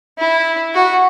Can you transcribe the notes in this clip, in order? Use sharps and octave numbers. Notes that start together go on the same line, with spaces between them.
E4
F#4